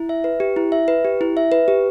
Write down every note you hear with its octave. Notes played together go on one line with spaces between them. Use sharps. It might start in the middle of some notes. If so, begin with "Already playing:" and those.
Already playing: E4
E5
B4
G4
E4
E5
B4
G4
E4
E5
B4
G4